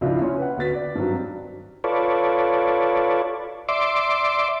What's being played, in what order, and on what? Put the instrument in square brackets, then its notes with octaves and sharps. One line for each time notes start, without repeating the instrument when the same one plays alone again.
[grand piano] C#2 F3 D4 E4 F4
C#4 C#5 C6
B4 F#5
D2 B3 F#4 A6 B6
D5
G2 D#3 F#3 C4
[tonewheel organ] F4 A4 B4 C#5 D5
D5 E5 C6 D6